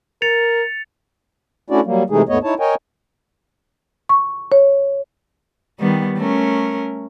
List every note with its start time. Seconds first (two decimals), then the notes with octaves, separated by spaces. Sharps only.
0.22 A#4 A6 C#7 F7
1.70 A3 C#4 D4 E4 F#4 D5
1.85 F#3 G3 A#3
2.10 C3 E3 G#3 A3 D#4 G#4
2.29 D#2 G#2 A3 B3 C#5 D#5
2.43 D#4 E4 C#5 A5
2.60 A#4 C#5 D#5 G5 G#5
4.09 C#6
4.52 C#5
5.79 D#3 G3 B3
6.17 A3 C#4 A#4